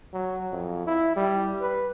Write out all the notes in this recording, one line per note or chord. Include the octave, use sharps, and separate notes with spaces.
F#3
F2
E4
G3
B4